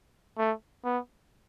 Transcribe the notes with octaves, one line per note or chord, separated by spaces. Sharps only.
A3
B3